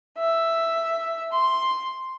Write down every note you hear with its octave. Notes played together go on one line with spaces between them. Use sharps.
E5
C6